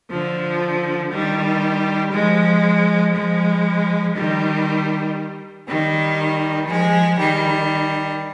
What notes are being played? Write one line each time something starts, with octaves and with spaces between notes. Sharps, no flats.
D3 F3
D#3 G3
F3 G#3
F3 G#3
D#3 G3
D#3 G3
F3 G#3
D#3 G3